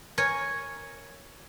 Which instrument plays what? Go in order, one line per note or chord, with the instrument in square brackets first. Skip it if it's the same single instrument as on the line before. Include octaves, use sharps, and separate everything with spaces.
[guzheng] A#4 C#5 G#5